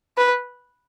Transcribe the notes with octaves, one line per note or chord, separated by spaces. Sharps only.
B4